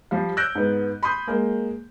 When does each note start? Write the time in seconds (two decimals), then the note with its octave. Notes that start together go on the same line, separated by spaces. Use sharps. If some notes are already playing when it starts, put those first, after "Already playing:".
0.11 F3 G3 F5
0.37 E6 F#6 G6 A#6 D7
0.55 G#2 B3
1.03 B5 C6 D#6 G6
1.27 G#3 A#3